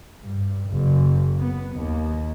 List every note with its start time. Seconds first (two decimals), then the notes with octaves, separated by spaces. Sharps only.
0.22 G2
0.69 F#1
1.38 B3
1.75 D#2